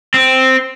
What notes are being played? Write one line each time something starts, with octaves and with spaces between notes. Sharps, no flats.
C4